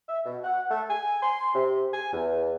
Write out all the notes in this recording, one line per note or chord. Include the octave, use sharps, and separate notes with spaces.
E5
B2
F#5
A3
G#5
C6
C3
G#5
E2